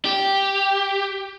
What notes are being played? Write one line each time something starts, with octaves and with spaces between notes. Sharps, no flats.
G4